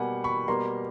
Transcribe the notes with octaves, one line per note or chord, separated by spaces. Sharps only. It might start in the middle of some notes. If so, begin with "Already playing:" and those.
Already playing: B2 G3 A#3 F#5 G#5
B5 C#6
B2 G3 A#3 A#5 C6